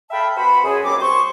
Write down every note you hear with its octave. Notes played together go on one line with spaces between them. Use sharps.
A4 E5 F5 G5 A5 B5
B3 F#4 C5 B5
F#2 G#4
D#2 F#3 C4 D6
C5 C#6